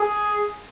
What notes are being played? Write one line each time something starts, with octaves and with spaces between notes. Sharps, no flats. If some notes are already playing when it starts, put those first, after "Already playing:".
Already playing: G#4